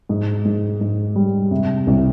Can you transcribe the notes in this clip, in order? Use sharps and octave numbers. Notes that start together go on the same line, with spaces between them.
G#2
G#2
G#2
G3
C3
C2